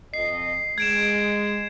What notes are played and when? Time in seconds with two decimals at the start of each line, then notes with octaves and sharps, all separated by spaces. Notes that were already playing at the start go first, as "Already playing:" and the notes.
0.14 F2 D#5 C7
0.78 G#3 G#6 D7 E7